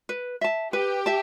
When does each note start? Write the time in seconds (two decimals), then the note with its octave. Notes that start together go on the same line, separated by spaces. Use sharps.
0.09 B4
0.41 E5 A5
0.73 G4 B4
1.06 E5 A5